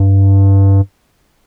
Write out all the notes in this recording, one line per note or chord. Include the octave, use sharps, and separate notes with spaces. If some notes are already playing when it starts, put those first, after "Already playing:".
Already playing: G2